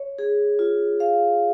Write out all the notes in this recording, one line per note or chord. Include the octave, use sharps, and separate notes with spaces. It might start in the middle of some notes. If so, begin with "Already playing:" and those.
Already playing: C#5
G#4
F4
F5